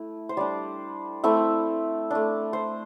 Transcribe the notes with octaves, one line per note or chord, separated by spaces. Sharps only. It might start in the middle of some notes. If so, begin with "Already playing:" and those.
Already playing: A3 E4
C5
G3 D4 D5
A3 C4 E4 E5
A3 D4
C5